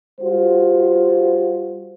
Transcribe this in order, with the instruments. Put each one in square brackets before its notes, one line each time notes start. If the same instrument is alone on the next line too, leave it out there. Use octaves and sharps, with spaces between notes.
[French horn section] G3 F4 F#4 C5